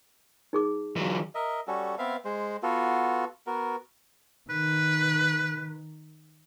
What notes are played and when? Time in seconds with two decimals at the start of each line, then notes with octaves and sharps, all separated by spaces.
0.53 D#4 G#4 D6
0.96 E3 F#3
1.35 A#4 D#5 E5
1.67 G3 C#4 F#4 A4
1.98 B3 C4 E5 F5
2.25 G#3 C5
2.63 B3 F4 F#4 A4
3.47 B3 F#4 A#4
4.50 D#3 B4